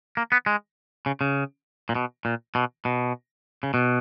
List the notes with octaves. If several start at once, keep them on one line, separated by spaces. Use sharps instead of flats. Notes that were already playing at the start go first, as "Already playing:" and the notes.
A#3
B3
G#3
C#3
C#3
A#2
B2
A#2
B2
B2
C#3
B2